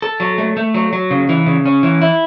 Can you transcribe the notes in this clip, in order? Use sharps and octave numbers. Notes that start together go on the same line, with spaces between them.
A4
F#3
A3
A3
F#3
F#3
C#3
E3
C#3
C#4
E3
E4